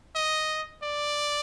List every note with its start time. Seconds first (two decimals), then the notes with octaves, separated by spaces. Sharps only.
0.15 D#5
0.83 D5